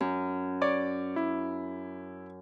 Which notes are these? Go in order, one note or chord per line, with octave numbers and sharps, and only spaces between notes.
F#2
C#5 D5 D6
E4